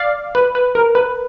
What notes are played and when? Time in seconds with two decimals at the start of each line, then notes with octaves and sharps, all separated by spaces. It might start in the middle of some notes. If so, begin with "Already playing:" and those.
Already playing: D5 F5
0.35 B4
0.55 B4
0.75 A#4
0.95 B4